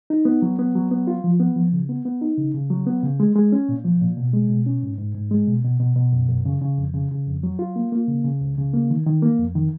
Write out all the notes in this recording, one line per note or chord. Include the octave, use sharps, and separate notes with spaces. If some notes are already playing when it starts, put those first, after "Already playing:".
D#4
B3
F#3
B3
F#3
B3
F4
F3
B3
F3
C#3
B3
B3
D#4
C#3
C#3
F#3
B3
C#3
G#3
G#3
C#4
A#2
F3
A#2
B2
G#3
B2
C#4
G#2
G#2
G#2
G#3
B2
B2
B2
B2
F#2
F#2
C#3
C#3
F2
C#3
C#3
F2
F#3
F4
A#3
A#3
C#3
C#3
C#2
C#3
A#3
D#3
D#3
A#3
F2
D#3